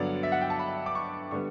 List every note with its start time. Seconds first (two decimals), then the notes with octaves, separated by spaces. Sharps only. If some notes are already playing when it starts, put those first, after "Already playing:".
Already playing: G2 D3 F#3 B3 D4 D5
0.23 E5
0.32 F#5
0.41 G5
0.50 A5
0.59 B5
0.86 D6
0.95 C#6
1.31 D3 G3 B3 C#6